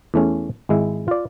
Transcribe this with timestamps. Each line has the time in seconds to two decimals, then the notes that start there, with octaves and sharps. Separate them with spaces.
0.14 E2 A3 C#4
0.69 G#1 G#3 E4
1.08 F4 D5